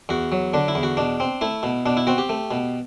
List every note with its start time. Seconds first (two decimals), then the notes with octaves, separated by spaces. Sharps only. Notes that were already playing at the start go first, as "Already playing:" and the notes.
0.09 E2 F#4
0.32 F#3
0.54 D3 D4
0.68 E4
0.75 E2
0.83 F#4
0.97 B2 D4
1.20 C4
1.41 A3 E4
1.63 B2
1.86 B2 D4
1.97 E4
2.07 C4 F#4
2.18 G4
2.29 A3
2.51 B2